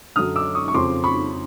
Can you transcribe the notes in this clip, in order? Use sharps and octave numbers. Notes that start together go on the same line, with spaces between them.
F#2 D3 F#3 D#6 F6
D6 E6
C#6 D#6
C#6
F2 C#3 F3 C6 D6
B5 C#6